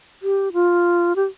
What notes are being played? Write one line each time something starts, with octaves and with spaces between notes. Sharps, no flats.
G4
F4
G4